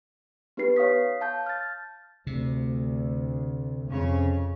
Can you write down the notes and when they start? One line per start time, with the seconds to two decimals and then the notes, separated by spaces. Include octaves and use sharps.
0.57 B3 D#4 G4 B4 C7
0.76 C#5 F5 C#6 D#6 B6
1.21 F5 A5 G6
1.46 F6 A6
2.27 D2 C3
3.90 F2 C#3 C#5